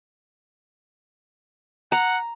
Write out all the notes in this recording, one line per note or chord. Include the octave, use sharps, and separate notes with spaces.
F#5 A#5